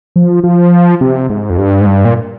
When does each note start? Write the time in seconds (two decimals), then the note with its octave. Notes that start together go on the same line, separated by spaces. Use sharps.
0.16 F3
0.44 F3
1.01 C3
1.30 G#2
1.50 F2
1.58 G2
1.81 G#2
1.86 G2
2.05 A#2